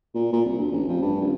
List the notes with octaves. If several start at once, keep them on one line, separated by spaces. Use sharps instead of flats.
A#2
A#2
C2
D2
A1
F2
G2
D#1